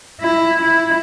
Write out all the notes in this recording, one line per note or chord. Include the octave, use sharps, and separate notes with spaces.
E4
E4